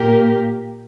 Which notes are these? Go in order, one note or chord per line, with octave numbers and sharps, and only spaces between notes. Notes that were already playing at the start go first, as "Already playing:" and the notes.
Already playing: A#2 A#3 G4 A#4